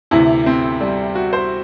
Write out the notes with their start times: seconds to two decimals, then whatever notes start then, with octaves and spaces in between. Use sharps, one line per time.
0.11 D2 C3 E3 E4
0.46 C4
0.81 G3
1.15 F#4
1.33 C5